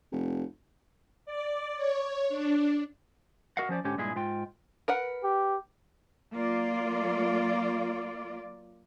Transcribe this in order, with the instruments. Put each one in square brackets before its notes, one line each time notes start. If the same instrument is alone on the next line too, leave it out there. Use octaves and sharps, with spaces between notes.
[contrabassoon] F1
[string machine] D5
C#5
D4
[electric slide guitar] F#4 A#4 D#5 F5 F#5
F3 C#4 C5 D5
G#2 D3 C#4 G4 C#5
G2 A#2 G#3 E4 G#4
G#2 F4 G5
[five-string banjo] A#4 B4 F#5
[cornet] G4
[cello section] F#3 A#3 F4 D5